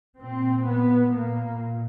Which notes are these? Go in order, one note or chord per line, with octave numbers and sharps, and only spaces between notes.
A#2 C4
B3
A#2 A#3